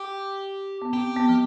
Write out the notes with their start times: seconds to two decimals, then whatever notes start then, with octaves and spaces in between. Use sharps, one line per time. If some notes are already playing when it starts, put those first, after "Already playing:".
Already playing: G4
0.82 B3
0.93 C4 G4
1.16 B3
1.29 F3